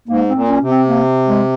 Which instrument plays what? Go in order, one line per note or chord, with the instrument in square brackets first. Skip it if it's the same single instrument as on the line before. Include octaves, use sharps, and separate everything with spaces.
[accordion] G#2 [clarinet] A#3
[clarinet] C4
[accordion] A#2
[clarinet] C#4
[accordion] C3
[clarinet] C4
A#3
G#3